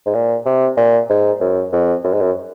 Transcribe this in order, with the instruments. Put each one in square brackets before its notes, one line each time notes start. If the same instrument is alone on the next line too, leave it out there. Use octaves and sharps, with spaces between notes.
[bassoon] G#2
A#2
C3
A#2
G#2
F#2
F2
F#2
G#2
F#2